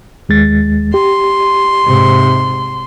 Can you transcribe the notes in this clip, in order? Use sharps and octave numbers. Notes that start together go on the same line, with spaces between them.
D#2 G#3 A6
G4 C6
G#2 C3